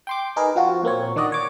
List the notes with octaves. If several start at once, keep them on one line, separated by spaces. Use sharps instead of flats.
G5 C6 D6
D#4 G#4 A#4 B4
F3 C4 F4 F#4
A#2 A#3 C4 C#5
D#3 D4 F#4 D5 D#5
C#5 D6